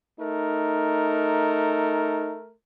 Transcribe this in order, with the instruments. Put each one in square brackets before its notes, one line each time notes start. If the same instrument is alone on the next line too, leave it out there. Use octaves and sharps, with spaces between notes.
[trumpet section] A3 A#4 [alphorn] D#4